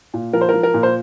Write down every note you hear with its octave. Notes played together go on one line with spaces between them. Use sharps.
A#2
F3 A#4
C5
A#4
F3
A#4
A#2
C5